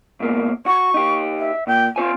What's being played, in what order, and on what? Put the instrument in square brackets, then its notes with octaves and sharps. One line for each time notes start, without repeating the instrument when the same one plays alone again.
[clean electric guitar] G#2 B2 A#3
[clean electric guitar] F#4 [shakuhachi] C#6
[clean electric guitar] D#4 G4
[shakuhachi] E5
[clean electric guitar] A#2 [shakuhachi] G5
[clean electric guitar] C4 C5 G#5 [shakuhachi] F4